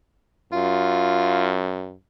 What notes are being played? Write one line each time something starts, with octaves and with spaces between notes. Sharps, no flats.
F#2 F4